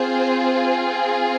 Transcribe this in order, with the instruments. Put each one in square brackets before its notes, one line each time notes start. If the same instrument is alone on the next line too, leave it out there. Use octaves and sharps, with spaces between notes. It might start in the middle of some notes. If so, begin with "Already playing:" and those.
Already playing: [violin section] C4 F4 G#4 C5